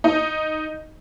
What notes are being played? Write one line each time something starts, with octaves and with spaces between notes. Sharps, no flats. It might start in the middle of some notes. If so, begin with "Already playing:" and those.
D#4